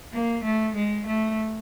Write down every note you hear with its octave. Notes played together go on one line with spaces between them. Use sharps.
A#3
A3
G#3
A3